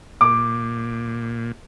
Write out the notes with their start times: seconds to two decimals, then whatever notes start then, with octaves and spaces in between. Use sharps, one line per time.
0.21 A#2 D6